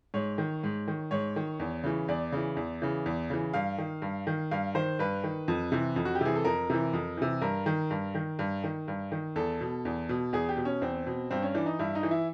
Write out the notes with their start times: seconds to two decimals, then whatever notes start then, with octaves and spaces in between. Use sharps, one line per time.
0.14 G#2 C#5
0.38 D#3
0.63 G#2
0.88 D#3
1.11 G#2 C#5
1.36 D#3
1.60 E2
1.84 C#3 E3
2.08 E2 D5
2.32 C#3 E3
2.57 E2
2.82 C#3 E3
3.06 E2
3.30 C#3 E3
3.53 G2 F5
3.78 D#3
4.02 G2
4.27 D#3
4.51 G2 F5
4.75 D#3 C5
4.99 G2 B4
5.24 D#3
5.48 F2
5.72 C3 E3
5.96 F2
6.05 F#4
6.15 G4
6.21 C3 E3 G#4
6.35 A4
6.45 F2 A#4
6.70 C3 E3
6.93 F2
7.17 C3 E3
7.41 G2 A#4
7.66 D#3
7.91 G2
8.15 D#3
8.39 G2
8.64 D#3
8.88 G2
9.12 D#3
9.36 E2 A4
9.61 B2
9.85 E2
10.09 B2
10.33 E2 G#4
10.49 G4
10.57 B2
10.65 C#4
10.82 E2 C4
11.06 B2
11.31 G2 C4
11.43 C#4
11.54 E3 D4
11.66 D#4
11.79 G2 E4
11.95 D#4
12.03 E3
12.11 E4